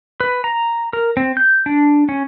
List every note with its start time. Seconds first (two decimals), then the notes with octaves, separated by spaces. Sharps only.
0.20 B4
0.44 A#5
0.93 A#4
1.17 C4
1.37 G6
1.66 D4
2.09 C#4